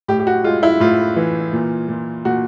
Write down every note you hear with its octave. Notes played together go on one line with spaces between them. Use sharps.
A2 G4
G4
F#4
G#3 F4
E4
A2 F4
E3
A#2
A#2
A#2 F#4